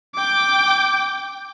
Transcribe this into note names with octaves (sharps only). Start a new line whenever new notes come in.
G5 D6